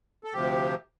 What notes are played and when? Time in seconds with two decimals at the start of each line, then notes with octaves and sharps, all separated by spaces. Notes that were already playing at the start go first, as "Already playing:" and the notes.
0.24 A4
0.33 D2 C3 F3 G4